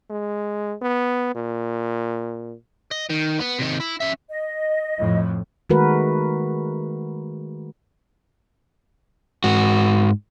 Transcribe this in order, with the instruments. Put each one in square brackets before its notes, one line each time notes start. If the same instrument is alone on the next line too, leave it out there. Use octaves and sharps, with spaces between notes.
[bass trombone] G#3
B3
A#2
[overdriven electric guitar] D#5
D#3
B3
C3 D#3
E4
C#4 E5
[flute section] D#5
[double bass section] F2 A2 F3
[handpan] D#3 G#3 A3 F#4 A#4 B4
[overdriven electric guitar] G#2 F#4